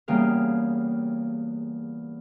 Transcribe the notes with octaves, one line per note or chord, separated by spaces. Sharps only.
E2 C#3 G3 A#3 F5